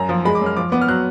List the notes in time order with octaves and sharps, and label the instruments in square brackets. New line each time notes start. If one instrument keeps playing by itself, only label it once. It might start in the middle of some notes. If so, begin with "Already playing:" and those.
Already playing: [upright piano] F#2 [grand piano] A#5
[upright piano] F3
[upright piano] G#3 [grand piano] B5
[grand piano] D6
[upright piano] F#2
[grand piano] F6
[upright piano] F3 [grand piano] D6
[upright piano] B3 [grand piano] D6
[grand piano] F6
[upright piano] F#3 [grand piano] F#6